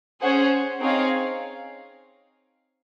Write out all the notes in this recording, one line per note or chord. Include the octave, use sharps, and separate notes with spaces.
C#4 G#4 C5 F#5
C4 D#4 G#4 C#5 F5